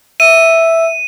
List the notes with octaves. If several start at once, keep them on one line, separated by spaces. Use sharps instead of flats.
E5 E6 D#7